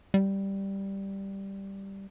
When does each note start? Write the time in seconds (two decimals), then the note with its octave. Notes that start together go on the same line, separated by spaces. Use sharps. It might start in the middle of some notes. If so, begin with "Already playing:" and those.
0.14 G3